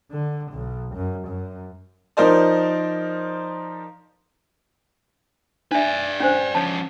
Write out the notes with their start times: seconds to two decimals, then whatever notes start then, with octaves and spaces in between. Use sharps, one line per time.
0.11 D3
0.52 B1
0.95 F#2
1.27 F#2
2.17 F3 D#4 A#4 C5 D5
5.72 D4 B4 D5 E5
6.20 C#4 D4 C5
6.55 F3 C#4 C#5 A5